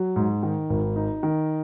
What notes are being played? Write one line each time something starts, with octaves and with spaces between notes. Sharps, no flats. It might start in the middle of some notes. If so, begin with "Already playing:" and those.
Already playing: F#3
G#2
D#3
G#1
D#4
D#3